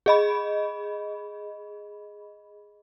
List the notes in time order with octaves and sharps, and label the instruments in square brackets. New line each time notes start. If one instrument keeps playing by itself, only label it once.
[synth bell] G#4 D#5 B5